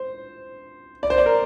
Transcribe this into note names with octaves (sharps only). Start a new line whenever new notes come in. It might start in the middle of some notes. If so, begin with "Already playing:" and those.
Already playing: C5
D5
C5
D5
A#4